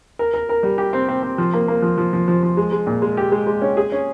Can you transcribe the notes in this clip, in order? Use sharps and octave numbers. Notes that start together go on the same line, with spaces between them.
A#4
A#4
A#4
G3
G4
C4
C4
C4
F3
A#3
A#3
F3
F3
F3
F3
F3
G#3
G#3
A#2
G#3
G4
G#3
G#3
C#4
G#4
C#4